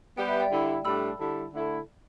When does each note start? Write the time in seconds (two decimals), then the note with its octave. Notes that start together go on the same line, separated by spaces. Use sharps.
0.17 G3 B3 G4 B4 G5
0.29 E5
0.40 D5 G5
0.51 D3 G3 E4
0.84 A2 G3 D4 A4 B5 E6
1.19 D3 G3 E4 A4
1.52 D3 A3 E4 A4